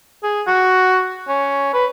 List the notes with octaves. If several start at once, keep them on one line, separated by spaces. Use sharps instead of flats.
G#4
F#4
C#4
B4